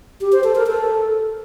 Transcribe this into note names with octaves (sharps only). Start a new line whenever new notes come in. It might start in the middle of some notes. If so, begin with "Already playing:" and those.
G4
C5
A4
A#4
A4